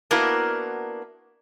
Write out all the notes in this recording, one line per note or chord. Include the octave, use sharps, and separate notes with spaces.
A#3 B3 D4 E4 F#4 A#4